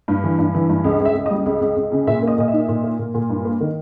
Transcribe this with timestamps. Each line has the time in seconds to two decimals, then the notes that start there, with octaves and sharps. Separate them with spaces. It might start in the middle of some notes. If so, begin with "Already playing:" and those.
0.08 G2
0.24 E3
0.39 G2
0.55 E3
0.69 G2
0.84 C#2
1.00 C#2
1.05 E5
1.15 C#2
1.26 D#5
1.30 G3
1.46 C#2
1.61 C#2
1.76 C#2
1.92 C#3
2.07 A#2 E5
2.23 A#3 D#5
2.38 A#2 D#5
2.48 E5
2.53 D#4
2.68 A#2
2.83 A#3
2.99 A#2
3.14 A#2
3.30 G2
3.45 A#3
3.60 D#3